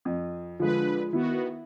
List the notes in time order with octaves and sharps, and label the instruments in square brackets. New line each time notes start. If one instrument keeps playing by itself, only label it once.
[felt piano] F2
[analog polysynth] D3 B4 [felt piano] F3 G#3
[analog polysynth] D#3 B3 F#4 [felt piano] E4